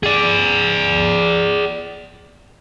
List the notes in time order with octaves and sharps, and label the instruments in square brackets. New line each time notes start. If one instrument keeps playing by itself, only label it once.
[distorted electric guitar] G#4 D5